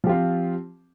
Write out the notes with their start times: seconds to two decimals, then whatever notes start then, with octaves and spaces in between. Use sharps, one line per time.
0.04 F3
0.06 G4
0.09 F4
0.12 C4